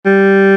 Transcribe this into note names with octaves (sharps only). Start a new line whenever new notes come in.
G3